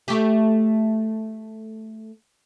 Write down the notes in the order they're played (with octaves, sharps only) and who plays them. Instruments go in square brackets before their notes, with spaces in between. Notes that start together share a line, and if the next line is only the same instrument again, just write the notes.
[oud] A3 G4